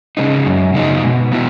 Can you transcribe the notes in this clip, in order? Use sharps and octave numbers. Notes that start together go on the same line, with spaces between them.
C#3 G#3 D#4
F#2
C#3 G#3 D#4
B2
G#3 B3 E4